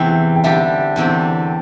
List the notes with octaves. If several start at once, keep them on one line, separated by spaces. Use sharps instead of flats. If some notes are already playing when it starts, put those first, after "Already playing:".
Already playing: E2 C3 E3 C4 D4 G5
G5
D3 G3 D4 G4 E5
E2 D3 C4 G4